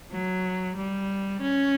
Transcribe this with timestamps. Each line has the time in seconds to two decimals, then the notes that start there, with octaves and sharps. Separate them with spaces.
0.12 F#3
0.77 G3
1.42 C#4